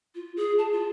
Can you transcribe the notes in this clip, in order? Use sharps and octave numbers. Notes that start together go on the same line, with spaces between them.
F4
G#4
A5
F4